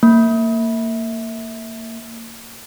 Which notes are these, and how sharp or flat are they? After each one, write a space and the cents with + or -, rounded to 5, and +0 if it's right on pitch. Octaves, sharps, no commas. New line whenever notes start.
A#3 -25